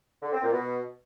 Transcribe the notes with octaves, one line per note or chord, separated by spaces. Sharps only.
D3
C4
A#2
B2